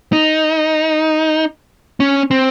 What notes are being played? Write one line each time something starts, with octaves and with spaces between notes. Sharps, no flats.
D#4
C#4
C4